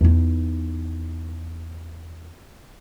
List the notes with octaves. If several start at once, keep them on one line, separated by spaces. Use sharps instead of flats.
E2 D#4